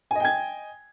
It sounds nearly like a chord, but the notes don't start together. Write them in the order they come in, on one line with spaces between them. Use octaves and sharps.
G#5 D#5 G5 G#6